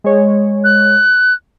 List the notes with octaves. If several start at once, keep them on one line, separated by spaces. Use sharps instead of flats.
G#3 C#5
F#6